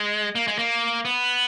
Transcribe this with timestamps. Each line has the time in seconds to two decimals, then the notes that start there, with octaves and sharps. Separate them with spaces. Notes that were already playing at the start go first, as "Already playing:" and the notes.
Already playing: G#3
0.35 A#3
0.47 G#3
0.59 A#3
1.05 B3